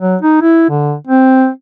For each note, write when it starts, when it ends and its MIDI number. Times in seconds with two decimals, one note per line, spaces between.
0.01 0.16 54
0.22 0.38 63
0.42 0.67 64
0.70 0.95 50
1.07 1.49 60